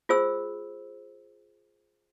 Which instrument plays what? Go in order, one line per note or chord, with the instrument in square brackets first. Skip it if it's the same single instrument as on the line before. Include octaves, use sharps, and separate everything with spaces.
[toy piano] F4 G#4 C5 E6